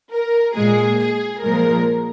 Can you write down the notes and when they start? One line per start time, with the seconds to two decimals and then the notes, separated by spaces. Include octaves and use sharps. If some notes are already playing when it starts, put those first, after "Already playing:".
0.12 A#4
0.55 A#2 G#3 G#4
0.99 G#4
1.42 A#2 F3 G#3 A#4